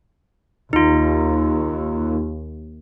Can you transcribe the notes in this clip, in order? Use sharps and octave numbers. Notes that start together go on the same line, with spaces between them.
D#2 D#4 F4